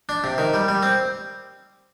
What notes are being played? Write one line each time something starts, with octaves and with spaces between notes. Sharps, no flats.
D4
C3
D#3
G3
G3
C4